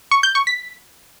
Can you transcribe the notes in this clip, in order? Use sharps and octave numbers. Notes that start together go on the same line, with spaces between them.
C#6
G6
C#6
B6